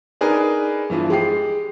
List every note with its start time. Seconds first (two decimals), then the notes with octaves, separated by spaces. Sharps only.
0.21 D4 D#4 G#4 A#4 B4
0.90 G2 E3 F3
1.10 G#3 G4 C7